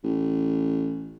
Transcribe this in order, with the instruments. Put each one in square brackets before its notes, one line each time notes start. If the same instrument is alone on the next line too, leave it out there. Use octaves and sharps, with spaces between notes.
[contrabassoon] A1